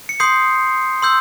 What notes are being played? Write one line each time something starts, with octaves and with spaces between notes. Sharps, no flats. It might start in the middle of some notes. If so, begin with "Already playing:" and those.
C#7
C6 D#6 G6 C7
C6 E6 G6